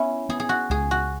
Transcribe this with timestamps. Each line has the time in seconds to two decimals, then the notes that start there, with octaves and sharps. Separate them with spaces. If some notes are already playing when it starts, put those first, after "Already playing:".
Already playing: B3 C#4 E4
0.29 B3 G#4
0.40 G#4
0.49 F#4
0.70 C#2 G#4
0.91 F#4